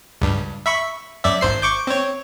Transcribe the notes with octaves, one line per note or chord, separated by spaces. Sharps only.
C#2 G2
E5 B5 C#6
F#2 D5 E5
G#1 C5 C7
C#6 D6 G6
C4 C#5